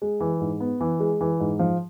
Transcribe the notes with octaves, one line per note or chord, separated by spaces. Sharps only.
G#3
E3
G#2
B3
E3
G#3
E3
G#2
F3